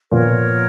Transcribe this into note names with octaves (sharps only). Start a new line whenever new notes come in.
A#2 F3 B3 A#4 C#5